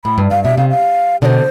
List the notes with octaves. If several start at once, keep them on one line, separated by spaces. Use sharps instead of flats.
A2 B5
G2
G2 F5
B2 E5
C3 F5
F5
B2 D3 C5 D5